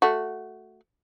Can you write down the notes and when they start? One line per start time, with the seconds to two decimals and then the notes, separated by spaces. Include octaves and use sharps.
0.02 A3 F#4